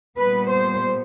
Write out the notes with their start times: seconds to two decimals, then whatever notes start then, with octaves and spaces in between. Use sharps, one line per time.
0.19 A#2 G3 B3 B4
0.50 C5